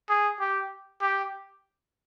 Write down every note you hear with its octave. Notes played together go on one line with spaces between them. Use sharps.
G#4
G4
G4